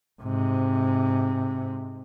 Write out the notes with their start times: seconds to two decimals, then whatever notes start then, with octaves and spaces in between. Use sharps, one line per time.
0.22 G#2 C3